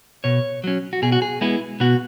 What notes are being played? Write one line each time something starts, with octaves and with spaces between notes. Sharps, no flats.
B2 C#5
F#3 C#4
F#4
B2 G#4
F#4
G#4
G#3 B3 E4
B2 F#4